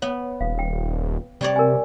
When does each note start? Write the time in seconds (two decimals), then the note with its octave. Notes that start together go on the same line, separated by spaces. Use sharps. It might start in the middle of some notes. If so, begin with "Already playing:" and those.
0.02 B3 C#5
0.41 D#1 F5
0.59 G5
1.41 C3 G3 C#5 D5
1.56 A#4 G#5